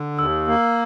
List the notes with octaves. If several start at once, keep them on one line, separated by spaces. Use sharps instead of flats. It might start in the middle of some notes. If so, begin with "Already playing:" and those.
Already playing: D3
D#2 E6
A#3